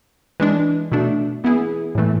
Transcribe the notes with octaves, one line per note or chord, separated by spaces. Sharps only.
E3 G#3 D4
B2 A3 D4
E3 B3 E4 G#4
A2 E3 A3